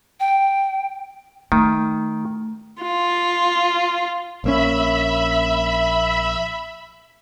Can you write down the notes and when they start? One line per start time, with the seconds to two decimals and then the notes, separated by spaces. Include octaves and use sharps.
0.20 G5
1.52 D#3 A3
2.82 F4
4.44 A#1 A#3 C#4 E5 B5